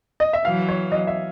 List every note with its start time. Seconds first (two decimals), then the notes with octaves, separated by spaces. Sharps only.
0.20 D#5
0.33 E5
0.45 E3 F#3 F5
0.68 C#5
0.92 D#5
1.07 E5